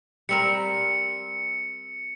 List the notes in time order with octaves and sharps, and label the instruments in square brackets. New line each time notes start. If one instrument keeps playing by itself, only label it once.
[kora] G3 C4 A#4 [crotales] C#7